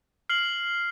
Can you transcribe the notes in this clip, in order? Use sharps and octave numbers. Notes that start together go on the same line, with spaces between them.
F6 C7 F#7